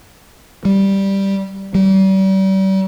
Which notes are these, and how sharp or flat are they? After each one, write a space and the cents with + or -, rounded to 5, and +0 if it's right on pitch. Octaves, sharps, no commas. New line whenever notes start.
G3 +0
G3 -35